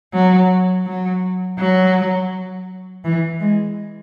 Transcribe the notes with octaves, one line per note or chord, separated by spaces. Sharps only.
F#3
F#3
F#3
E3
G#3